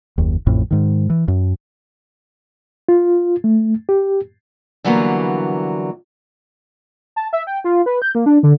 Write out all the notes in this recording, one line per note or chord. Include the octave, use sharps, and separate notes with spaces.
F#1 D#2
A1 F2 A2
G#2 D#3
E3
F#2
F4
A3
G4
D3 E3 F#3 G3 A#3 B3
A5
E5
G5
F4
B4
G6
A#3
D4
D3